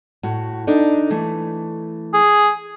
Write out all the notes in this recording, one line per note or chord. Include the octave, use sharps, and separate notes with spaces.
A2 F#4
D4 D#4 A4
E3 A3
G#4